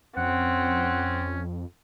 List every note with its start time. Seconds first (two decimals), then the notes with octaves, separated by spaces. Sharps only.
0.17 F2 C4 C#4 F#5